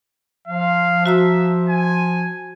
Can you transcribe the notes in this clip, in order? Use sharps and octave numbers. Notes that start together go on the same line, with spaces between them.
F3 F5
F#4 E5 A#5 E6
G#5